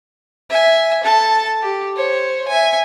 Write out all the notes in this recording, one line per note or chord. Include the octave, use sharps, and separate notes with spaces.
E5 G#5
A4 A5
G4
C5 C#5
E5 G#5